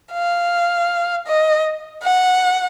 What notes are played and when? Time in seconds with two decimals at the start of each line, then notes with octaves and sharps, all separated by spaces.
0.13 F5
1.27 D#5
2.03 F#5